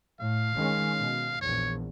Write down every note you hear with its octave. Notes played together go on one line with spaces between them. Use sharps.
A2 F5
D#3 G#3 C#4
B2
A#1 E2 C#5